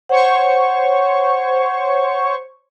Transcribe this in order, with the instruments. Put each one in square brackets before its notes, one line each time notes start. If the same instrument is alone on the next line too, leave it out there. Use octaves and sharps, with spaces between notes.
[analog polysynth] C5 C#5 C#6 [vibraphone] F#5